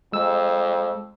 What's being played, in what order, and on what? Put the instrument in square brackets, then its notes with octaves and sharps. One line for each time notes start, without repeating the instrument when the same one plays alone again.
[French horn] F2 [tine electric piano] G#3 E6